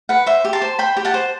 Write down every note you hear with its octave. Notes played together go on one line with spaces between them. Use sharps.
B4 F#5
C5 E5
G4
A5 C6
C5
C5 G5 B5
G4
F#5 A5
C5